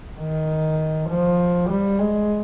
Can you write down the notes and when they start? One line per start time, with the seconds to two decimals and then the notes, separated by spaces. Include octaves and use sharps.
0.19 D#3
1.09 F3
1.69 G3
1.99 G#3